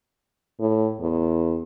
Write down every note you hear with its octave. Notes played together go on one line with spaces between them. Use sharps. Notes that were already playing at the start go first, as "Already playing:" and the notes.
A2
E2